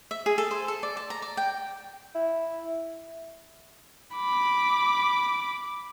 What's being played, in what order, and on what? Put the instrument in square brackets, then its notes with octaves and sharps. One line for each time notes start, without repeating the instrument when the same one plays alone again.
[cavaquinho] E5
G#4
A4
C5
A4
D5
A5
A#5
D5
G5
[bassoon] E4
[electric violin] B5 D6